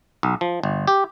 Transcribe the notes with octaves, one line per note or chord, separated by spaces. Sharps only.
B1
F3
G1
G4